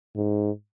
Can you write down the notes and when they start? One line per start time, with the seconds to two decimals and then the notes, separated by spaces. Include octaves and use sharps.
0.16 G#2